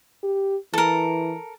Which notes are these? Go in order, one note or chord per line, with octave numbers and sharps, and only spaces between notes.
G4
E3 A4 A#4